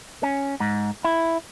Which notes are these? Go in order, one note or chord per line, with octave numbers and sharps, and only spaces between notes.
C#4
G#2
E4